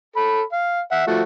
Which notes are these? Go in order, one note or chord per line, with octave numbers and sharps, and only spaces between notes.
A4 B5
F5
E5 F#5
F3 A3 F#4